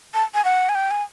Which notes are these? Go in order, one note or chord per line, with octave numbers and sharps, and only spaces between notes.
A5
G#5
F#5
G#5
G5
G#5